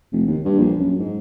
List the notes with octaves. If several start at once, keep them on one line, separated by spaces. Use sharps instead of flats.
F1
D#2
G2
A#1
F#2
G#2